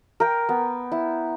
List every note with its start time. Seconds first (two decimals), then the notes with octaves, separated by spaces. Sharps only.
0.20 A#4 G5
0.49 B3
0.92 E4